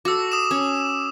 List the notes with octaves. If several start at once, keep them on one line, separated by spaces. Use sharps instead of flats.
F#4 A4 D6 E6
D#6 E7
C#4